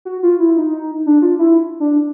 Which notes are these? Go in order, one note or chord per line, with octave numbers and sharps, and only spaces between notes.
F#4
F4
E4
D#4
D4
F4
E4
D4